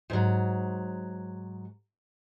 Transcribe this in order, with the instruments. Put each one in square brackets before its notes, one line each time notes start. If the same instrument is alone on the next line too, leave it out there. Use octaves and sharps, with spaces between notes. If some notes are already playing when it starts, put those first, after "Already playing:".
[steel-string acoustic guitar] G#2 F#3